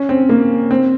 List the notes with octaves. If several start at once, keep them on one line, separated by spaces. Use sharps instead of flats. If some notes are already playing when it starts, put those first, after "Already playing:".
Already playing: C#4
C4
A#3
C4